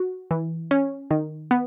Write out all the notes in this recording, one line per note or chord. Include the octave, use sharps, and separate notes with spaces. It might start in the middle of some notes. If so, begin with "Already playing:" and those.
Already playing: F#4
E3
C#4
D#3
B3